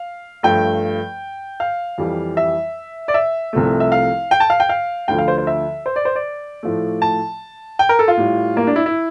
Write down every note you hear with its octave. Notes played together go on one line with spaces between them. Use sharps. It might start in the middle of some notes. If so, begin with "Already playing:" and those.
Already playing: F5
G2 F3 A3 G5
F5
F2 E3 G3
E5
D5
E5
C2 C3 F3 A3
E5
F5
G5
A5
F5
G5
F5
D2 D3 F3 G5
F5
C5
C5
E5
C5
D5
C5
D5
A2 F3 A3
A5
G5
A#4
A4
F4
A2 G3
A#3
D4
E4
E4